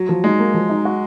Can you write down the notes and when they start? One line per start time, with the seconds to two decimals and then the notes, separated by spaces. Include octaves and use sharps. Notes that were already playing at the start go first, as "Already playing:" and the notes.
Already playing: F#3
0.09 F3
0.23 G#3 D#4
0.39 A#3
0.54 F3
0.69 D#4
0.85 F#4